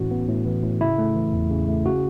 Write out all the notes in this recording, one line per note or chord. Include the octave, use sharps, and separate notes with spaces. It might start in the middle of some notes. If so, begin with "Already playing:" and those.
Already playing: A2 E3 C#4 F#4
B3
A2
E3
A2
C#3 E4
A3
E3
E2
C#3
A3
C#3 F#4